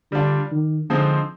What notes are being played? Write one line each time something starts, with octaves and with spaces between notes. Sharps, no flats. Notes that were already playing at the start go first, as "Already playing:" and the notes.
D3 G3 D4 F4
D#3
D3 F3 G#3 C4 D#4